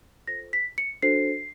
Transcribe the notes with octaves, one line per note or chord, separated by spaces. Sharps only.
F4 A4 C5 A#6
B6
C#7
D4 F#4 A4 C5 C7